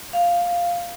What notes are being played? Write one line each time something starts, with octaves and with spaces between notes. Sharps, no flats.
F5